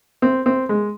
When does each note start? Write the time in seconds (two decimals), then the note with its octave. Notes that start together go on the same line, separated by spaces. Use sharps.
0.22 C4
0.46 C4
0.69 G#3